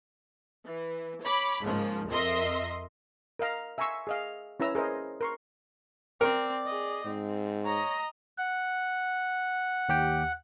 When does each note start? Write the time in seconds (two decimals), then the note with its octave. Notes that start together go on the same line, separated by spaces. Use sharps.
0.68 E3
1.24 C#5 B5 D6
1.63 G#2 C#3 F3 A#3
2.10 F2 A#4 D#5 E5 C6 A#6
3.39 A#4 D#5 F5 A#5
3.78 E5 G#5 A#5 C6 C#6 E6
4.07 G#4 D#5 F5
4.60 C#4 E4 B4 A#5 E6
4.75 G#4 A#4 C5 D#5
5.21 A#4 C6 C#6
6.21 C4 A#4 D5
6.66 G#4 D#5
7.06 G#2 C4
7.65 C#5 D#5 A#5
8.38 F#5
9.89 D#2 G4 G5